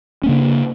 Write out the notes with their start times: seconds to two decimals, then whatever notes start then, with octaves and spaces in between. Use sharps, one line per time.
0.23 C#4
0.26 A#3
0.29 C#3
0.31 D4